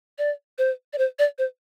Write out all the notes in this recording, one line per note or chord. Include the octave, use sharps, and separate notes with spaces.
D5
C5
D5
C5
D5
C5